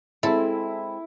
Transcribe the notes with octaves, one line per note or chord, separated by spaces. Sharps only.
G#3 C4 E4 A4